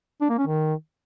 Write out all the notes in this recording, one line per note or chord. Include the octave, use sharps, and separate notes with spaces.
D4
A#3
C#4
D#3